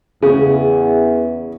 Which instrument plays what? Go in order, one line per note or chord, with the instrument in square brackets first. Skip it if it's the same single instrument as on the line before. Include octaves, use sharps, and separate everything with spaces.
[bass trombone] E2 [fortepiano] C#3